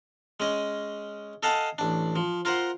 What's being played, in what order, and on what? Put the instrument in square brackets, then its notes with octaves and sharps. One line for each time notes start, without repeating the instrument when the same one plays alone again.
[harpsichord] G#3 C#4 D#5
A4 D#5 F5 F#5 G#5 A5
A1 D4
F3
F4 A#4 C5 F#5